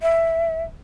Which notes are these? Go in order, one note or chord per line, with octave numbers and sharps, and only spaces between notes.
E5